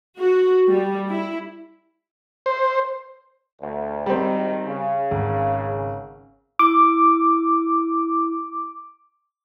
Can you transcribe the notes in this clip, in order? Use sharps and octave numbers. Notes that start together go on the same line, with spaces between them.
F#4
G3
E4
C5
D2
G#1 D#3 G3 C4
C#3
G#1
E4 D6